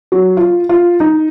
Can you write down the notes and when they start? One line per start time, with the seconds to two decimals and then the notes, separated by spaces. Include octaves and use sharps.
0.12 F#3
0.37 F4
0.69 F4
1.00 D#4